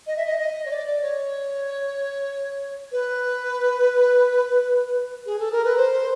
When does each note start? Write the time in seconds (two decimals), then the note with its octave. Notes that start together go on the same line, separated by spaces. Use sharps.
0.07 D#5
0.16 E5
0.25 D#5
0.38 D#5
0.65 C#5
0.70 D5
1.01 C#5
2.92 B4
5.26 G#4
5.39 A4
5.51 A#4
5.64 B4
5.76 C5